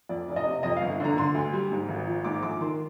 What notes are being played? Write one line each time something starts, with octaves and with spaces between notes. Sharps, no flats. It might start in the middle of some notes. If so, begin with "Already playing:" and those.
F2 D5
F1 D5
D#5
C3
F2 D#5
F5
G1
D3 A#5
D3 C6
D2
G3
G#2
G#1
F3
G#2 D6
A#1 D6
D#3 C6